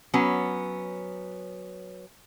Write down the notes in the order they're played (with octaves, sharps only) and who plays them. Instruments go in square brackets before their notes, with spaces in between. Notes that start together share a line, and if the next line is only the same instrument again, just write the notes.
[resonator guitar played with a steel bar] F#3 B3 C#4